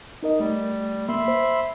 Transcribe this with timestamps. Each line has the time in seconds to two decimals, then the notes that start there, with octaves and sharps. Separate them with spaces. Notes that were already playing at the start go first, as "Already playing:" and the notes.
0.23 D#4 A#4 D#5
0.40 G3 A3
1.09 A#3 E5 B5 C6
1.28 C5